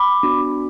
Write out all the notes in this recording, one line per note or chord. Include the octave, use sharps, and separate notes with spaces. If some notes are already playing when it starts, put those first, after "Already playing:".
Already playing: B5 D6
B3 D4 F#4